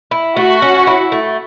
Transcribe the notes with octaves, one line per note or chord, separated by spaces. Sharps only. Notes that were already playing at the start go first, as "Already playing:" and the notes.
E4
A3 F#4
C#4
E4
A3